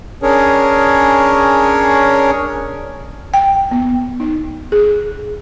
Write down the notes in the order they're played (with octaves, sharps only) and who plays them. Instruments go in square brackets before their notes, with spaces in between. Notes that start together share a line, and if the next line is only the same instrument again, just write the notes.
[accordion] C#4 D4 G#4 A#4 C#5
[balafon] G5
B3
D#4
G#4